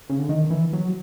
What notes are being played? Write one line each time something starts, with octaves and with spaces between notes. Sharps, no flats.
C#3
D3
D#3
E3
F#3